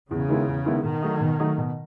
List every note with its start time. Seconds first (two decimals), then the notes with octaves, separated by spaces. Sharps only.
0.10 E2 C#3
0.29 D#3 G#3 B3 E4
0.48 E2
0.66 D#3 G#3 B3 E4
0.84 B2 D#3
1.02 F#3 A3 D#4
1.21 B2
1.40 F#3 A3 D#4
1.58 B2